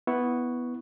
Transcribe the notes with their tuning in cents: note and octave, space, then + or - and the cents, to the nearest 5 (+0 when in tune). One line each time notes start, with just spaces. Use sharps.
B3 +0 E4 -5 C#6 +0